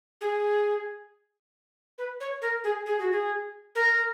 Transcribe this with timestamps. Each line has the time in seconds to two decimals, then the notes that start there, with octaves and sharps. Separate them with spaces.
0.21 G#4
1.98 B4
2.20 C#5
2.42 A#4
2.64 G#4
2.86 G#4
2.99 F#4
3.12 G#4
3.75 A#4